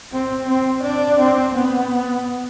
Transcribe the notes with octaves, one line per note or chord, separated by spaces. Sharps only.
C4
C4
D4
C4
B3